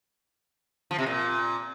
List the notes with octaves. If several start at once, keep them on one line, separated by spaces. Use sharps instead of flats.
F3
C3
A#2